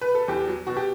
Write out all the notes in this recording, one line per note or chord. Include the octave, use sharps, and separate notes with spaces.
B4
A4
E2 G4
F#3
B2 F#4
G4